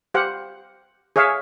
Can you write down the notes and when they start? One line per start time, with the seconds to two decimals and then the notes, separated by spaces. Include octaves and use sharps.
0.14 G4 C5 F5 F#5
1.16 G#4 C#5 E5 F5 G#5